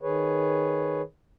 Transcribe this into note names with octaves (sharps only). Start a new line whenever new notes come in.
D#3 G#4 B4 C#5